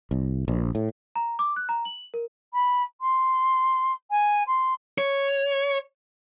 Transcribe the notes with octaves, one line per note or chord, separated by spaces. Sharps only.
C2
A#1
A2
A#5
D6
F#6
A#5
F#7
A#4
B5
C6
G#5
C6
C#5